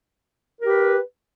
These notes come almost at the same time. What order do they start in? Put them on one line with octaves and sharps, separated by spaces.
A#4 G4 B4